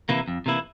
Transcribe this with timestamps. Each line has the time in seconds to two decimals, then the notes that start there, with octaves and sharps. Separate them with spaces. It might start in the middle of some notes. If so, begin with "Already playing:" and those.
0.09 C3 E3 A#3 E4
0.28 F2
0.46 C3 E3 A#3 E4